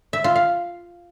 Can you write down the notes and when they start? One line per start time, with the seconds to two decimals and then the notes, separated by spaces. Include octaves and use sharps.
0.13 E5
0.24 F4
0.36 F5